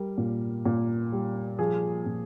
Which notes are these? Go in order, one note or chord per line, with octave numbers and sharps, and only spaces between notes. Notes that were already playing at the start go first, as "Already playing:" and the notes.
Already playing: G3 A#4
A#2
A#2
G3
F3 G#4
A#2